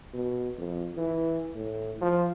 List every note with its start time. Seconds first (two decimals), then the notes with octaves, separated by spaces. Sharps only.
0.14 B2
0.58 F2
0.97 E3
1.55 A2
2.01 F3